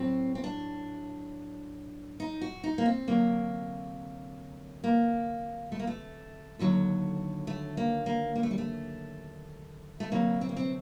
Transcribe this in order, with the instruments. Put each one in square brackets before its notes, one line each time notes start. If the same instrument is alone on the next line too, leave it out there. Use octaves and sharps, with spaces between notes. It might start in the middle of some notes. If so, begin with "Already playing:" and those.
Already playing: [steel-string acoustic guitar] A2 F#3 C4
C4
D4
D#4
F#4
D#4
A#3
C4
D2 C3 F#3 A#3
A#3
A3
A#3
A3
D#2 D3 F#3
A3
A#3
A#3
A#3
A3
G3
A3
A3
D2 C3 F#3 A#3
C4
A#3
C4